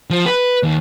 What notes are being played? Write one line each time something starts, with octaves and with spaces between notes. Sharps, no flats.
F3
B4
D#2